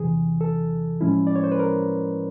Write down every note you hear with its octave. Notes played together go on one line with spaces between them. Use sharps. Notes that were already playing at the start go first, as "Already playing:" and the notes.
Already playing: E2 C3 E3 G#4
A4
A2 F3 G#3 C#4 E4
D5
C#5
C5
B4
A#4